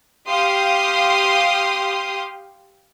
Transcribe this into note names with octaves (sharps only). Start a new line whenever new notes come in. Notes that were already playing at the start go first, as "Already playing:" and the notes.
G4 F5 C6 D#6